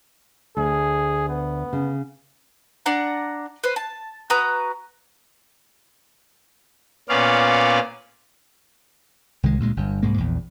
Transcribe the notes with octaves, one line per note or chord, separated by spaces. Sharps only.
D2 G#4
B3
C#3
D4 D5 F#5 A#5
B4 C5
A5
F#4 B4 A#5 D#6
A#2 B3 C#4 D5 F5
C2 D#3 G#3
D2 A#2 G#3
G1 G2
C2 G#2 G#3 A#3
A#1 E2